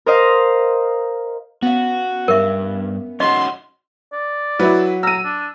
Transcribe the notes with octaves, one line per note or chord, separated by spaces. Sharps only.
A#4 C5 D#5 F5
B3 C#4 F#4 F5
G2 A#4 E5
C#4 D#4 F#4 D#5 C6
D5
F#3 E4 B4
A#5 E6 D#7
D4